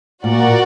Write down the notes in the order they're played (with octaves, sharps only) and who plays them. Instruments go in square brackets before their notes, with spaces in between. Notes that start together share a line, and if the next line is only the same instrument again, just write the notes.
[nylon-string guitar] A#2 [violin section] F#4 A#4 D5 F#5